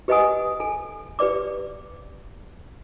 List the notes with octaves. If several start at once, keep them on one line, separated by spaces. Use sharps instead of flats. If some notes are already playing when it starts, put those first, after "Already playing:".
G4 B4 D#5 F#5 G#5 D#6
A4 G#5
G4 B4 D5 D6